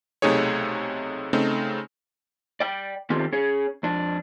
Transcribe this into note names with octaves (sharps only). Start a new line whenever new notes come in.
B1 C3 A3 D#4 G#4 C#5
C#3 A3 C4 D#4
D5 G5
D#3 C4 F4 G4 A4
C#4 G#4 C#5
F2 D4